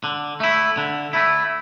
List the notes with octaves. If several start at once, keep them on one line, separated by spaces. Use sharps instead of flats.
D3
A3 E4
D3
A3 E4